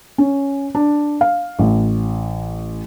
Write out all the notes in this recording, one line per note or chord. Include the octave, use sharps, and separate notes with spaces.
C#4
D4
F5
A1